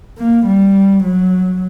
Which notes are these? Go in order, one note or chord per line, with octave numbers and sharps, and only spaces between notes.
A#3
G3
F#3